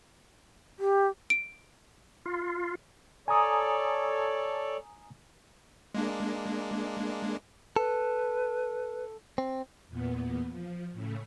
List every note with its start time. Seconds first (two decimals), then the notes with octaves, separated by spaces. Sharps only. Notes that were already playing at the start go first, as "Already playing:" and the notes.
0.79 G4
1.30 D7
2.26 F4
3.28 A4 C#5 D5 G#5 A#5 D#6
5.95 G#3 A#3 D4
7.76 A4 B4
9.38 C4
9.88 E2 A#2 B3
10.50 F3
10.93 A2 C#3 A3